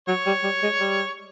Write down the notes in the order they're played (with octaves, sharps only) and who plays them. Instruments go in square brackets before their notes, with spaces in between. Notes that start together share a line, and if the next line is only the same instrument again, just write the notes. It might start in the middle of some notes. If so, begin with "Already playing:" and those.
[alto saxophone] F#3 [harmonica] C#5
[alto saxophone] G3
G3
G#3
G3